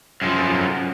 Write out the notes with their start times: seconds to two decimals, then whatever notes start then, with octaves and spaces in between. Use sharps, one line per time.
0.22 F#2 F3